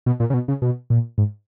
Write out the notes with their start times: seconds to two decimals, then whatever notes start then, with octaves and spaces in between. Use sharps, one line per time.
0.06 B2
0.20 A#2
0.30 C#3
0.34 B2
0.48 C#3
0.62 B2
0.90 A#2
1.18 G#2